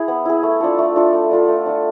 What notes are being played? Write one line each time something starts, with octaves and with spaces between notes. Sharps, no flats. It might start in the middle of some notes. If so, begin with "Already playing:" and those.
Already playing: E4 G#4
B3
E4 G#4
A3
D4 F4 A4
A3
D4 F4 A4
A3
D4 F4 A4
A3
D4 F4 A4